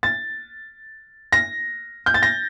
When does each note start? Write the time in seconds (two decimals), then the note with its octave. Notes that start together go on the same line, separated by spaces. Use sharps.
0.03 A6
1.32 A#6
2.06 G6
2.14 A6
2.23 A#6